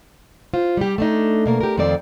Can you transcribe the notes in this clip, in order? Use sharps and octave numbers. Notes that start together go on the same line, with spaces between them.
F4 C5
G3 G4
A3 D4 D#4
B2 A#3 A#4
G4 A#4
F2 D#3 F3 C4 A4 D5